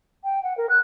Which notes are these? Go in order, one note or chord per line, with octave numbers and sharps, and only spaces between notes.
G5
F#5
A#4
F#6